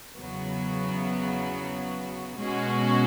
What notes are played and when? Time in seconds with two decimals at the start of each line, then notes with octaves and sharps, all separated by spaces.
0.18 E2 C#3 F#3 B3 F#4
2.37 B2 G#3 C#4 F#4